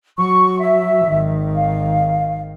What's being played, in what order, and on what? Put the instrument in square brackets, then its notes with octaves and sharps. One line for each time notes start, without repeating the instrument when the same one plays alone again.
[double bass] F#3 [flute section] C#6
[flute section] E5
[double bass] G#1 D#3
[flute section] F5